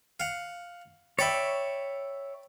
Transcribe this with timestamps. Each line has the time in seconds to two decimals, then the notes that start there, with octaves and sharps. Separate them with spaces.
0.20 F5 F#5
1.19 C#5 D5 E5 G5 B5